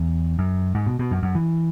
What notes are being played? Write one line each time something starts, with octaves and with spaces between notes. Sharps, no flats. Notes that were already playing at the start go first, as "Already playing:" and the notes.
Already playing: E2
F#2
G#2
B2
B2
F#2
F#2
E3